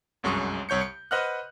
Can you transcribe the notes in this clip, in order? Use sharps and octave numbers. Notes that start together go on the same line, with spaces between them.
G1 C2 F#2 G#3 C#6 D#6
C2 C#5 G6 C#7
C#7
B4 C5 D#5 F#5 F6 F#6